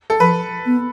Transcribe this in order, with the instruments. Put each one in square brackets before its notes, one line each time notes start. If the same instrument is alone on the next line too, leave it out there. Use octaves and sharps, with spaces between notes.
[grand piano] A4
[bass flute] F3 [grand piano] B4
[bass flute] B3